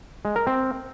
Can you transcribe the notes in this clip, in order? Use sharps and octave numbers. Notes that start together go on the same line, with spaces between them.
G#3
A#4
C4